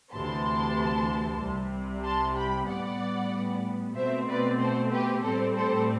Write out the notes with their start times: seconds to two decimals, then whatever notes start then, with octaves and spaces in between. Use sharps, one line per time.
0.13 D2 C3 E3 A5 C6
1.41 C2 C3 G3
2.04 A5 C6
2.36 G5 B5
2.67 A2 G3 B3 D5 F#5
3.95 B2 A3 C4 C5 E5
4.27 B4 D5
4.59 A4 C5
4.91 G4 B4
5.22 A2 G3 C4 A4 C5
5.55 A4 C5